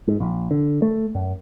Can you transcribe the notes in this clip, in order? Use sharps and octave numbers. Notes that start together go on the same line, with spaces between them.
G#2
A#1
D3
A3
F#2